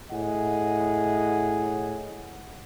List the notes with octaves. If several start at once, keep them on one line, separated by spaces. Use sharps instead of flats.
A2 G#4 D#5 F#5